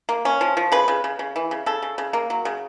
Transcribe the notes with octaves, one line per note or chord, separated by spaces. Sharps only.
A#3
C#4
F3
F3
C#3 B4
C#3
C#3
C#3
E3
C#3
C#3 A4
C#3
C#3
A#3
F#3
C#3